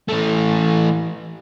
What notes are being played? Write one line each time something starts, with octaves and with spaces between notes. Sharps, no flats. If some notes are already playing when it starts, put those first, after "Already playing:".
E3 A3